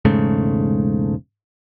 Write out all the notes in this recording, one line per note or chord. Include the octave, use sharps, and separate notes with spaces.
E1 G#2 C#3 A3